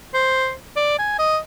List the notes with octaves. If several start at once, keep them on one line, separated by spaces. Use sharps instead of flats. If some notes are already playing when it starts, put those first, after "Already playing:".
C5
D5
G#5
D#5